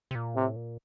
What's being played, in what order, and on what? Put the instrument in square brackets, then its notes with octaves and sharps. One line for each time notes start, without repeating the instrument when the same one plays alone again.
[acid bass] C3
A#2
[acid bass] A2 [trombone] C3
[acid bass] A#2